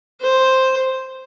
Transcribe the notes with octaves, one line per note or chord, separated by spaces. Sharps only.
C5